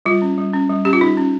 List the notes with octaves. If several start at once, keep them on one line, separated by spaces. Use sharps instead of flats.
G3 F4
C#4
G3
C#4
G3
C#4 G4
F4
G3 D#4
C#4